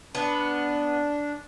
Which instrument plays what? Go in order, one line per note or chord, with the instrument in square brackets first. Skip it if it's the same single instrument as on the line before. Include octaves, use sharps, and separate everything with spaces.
[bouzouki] B3 [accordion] D4